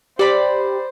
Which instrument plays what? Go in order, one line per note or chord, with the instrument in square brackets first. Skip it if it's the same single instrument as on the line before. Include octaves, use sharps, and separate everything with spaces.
[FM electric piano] G4 [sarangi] C5 [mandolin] D5 B5